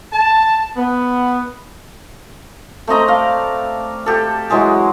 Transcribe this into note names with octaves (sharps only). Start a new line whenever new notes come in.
A5
B3
A3 C4 D#5 A#5
D5 F5
G4 A4
E3 F#3 G#3 G#4